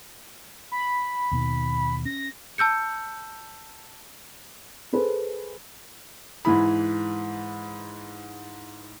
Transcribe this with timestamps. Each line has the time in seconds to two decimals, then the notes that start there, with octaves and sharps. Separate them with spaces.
0.72 B5
1.32 D#2 B2 D#3
2.05 C#4 A#6
2.58 A5 E6 G6 C#7
4.93 G#4 A4 B4 C5
6.45 G#2 E3 E4 B5